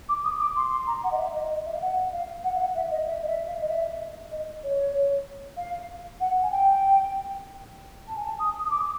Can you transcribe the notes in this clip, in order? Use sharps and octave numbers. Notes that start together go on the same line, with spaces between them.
D6
D#6
D6
C6
C6
A#5
F#5
D#5
E5
D#5
D#5
E5
F5
F#5
F5
F#5
F5
F#5
E5
D#5
E5
D#5
E5
F5
D#5
E5
D#5
C#5
F5
F#5
G#5
G5
A5
G#5
A5
D#6
D#6
D6